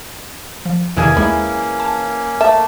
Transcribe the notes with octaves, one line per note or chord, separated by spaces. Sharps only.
F3
E2 C3 D#3 E3 A#3 C#4 G#4 G#5
D#2 G#3 E4
A5
A3 A#3 E5 A5